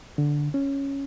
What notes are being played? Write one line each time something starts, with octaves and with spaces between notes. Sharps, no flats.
D3
C#4